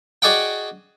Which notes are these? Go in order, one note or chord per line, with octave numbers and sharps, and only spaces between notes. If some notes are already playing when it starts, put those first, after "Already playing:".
F#4 G#4 D5 D#5 F#5 G5